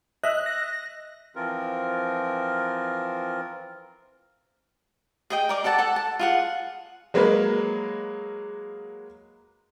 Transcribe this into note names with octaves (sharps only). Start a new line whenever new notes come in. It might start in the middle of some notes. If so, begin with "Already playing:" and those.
D#5 E5 F#6
A#6
E3 F3 C4 F4 A#4
G#4 D#5 G5
A#4 D5 D6
A4 D5 F#5 A5
A4 F#5
A5
F4 G#4 F#5
F#3 G#3 A#3 A#4 B4